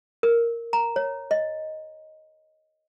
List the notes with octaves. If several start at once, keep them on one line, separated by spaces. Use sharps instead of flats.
A#4
A#5
C#5
D#5